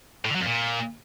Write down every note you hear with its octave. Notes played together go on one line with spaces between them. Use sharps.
A2
D3
F#3
F2
A#2